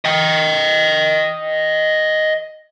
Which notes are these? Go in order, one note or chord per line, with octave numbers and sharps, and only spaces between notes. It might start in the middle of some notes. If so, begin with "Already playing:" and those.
D#5 G5